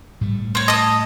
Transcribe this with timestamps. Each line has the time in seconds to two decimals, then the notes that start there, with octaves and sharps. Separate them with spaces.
0.21 A2 G3 A3
0.55 C4 C#5
0.68 D#5 A5 D#6